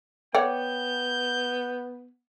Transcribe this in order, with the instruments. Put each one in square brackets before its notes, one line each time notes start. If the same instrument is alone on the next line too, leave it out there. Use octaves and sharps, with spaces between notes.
[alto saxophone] B3 [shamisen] C#5 D5 F#5 [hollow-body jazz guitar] G5 [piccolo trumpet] G6